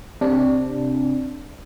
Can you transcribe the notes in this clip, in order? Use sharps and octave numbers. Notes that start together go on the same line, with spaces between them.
C3 D4